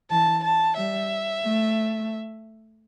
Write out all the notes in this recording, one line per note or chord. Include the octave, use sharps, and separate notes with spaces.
E3 A5
A5
G3 E5
A3